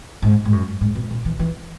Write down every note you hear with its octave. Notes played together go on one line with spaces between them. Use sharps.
G#2
G#2
F#2
G#2
B2
B2
E3
E3